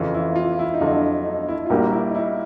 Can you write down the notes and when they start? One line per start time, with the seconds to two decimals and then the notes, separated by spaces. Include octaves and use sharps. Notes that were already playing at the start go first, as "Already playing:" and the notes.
Already playing: F2 C#3 E3 F4
0.14 E4
0.36 F4
0.59 E4
0.74 D#4
0.80 F2 D3 F#3 D4
1.25 D#4
1.48 E4
1.66 F4
1.70 A#1 A#2 G3 A#3 F#4
1.92 E4
2.09 D#4
2.15 E4